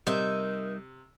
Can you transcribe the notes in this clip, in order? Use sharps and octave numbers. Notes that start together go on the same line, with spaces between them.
C3 G3 D#4 A#4 E5